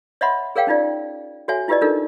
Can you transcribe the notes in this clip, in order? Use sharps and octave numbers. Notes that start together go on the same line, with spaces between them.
C#5 D#5 E5 F#5 B5 C6
G#4 A#4 C#5 F5 G5
C#4 D#4 F4 D5
F#4 A4 C#5 E5 G#5
E4 F4 G4 B4 D5 D#5
D4 D#4 F4 A4 A#4